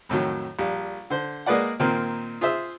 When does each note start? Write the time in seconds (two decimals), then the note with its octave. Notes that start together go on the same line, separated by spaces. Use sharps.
0.09 F2 A2 D#3 F#3
0.59 A#1 G3
1.10 D3 C5
1.46 G#3 A#3 G#4 B4 D5 F#5
1.80 A#2 D#3 A#3 C4
2.41 F4 G#4 C5 E5 E6